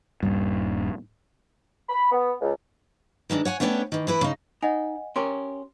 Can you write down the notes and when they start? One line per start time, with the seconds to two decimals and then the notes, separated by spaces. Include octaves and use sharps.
0.23 D#1 G2
1.89 B5
2.11 B3
2.41 C#2
3.30 D#3 E3 G#3 D4
3.45 C#5 F#5 G#5
3.60 A3 B3 C#4 D4 C#5 G5
3.92 D#3 E3
4.07 E3 E4 B4
4.21 C#3 D#4
4.62 D#4 D#5 F#5 G#5
5.16 C#4 G4 A#4 C6